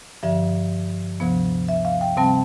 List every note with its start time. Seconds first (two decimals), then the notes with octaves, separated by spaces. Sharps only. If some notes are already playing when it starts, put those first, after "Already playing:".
0.23 G2 D3 F3 E5
1.20 D2 C3 F3 B3
1.69 E5
1.85 F5
2.01 G5
2.17 C3 G3 C4 A5